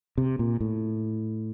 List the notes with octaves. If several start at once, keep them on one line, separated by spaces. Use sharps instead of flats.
C3
A#2
A2